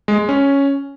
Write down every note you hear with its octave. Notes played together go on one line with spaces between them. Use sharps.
G#3
G#3
C#4